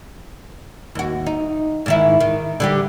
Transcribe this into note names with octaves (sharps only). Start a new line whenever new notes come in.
D#2 F#4
D#4
G#2 D#3 E4
D#3
D3 G3 G4